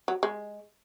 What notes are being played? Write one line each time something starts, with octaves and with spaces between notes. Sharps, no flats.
F#3
G#3